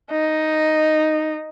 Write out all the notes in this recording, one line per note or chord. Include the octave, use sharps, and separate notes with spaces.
D#4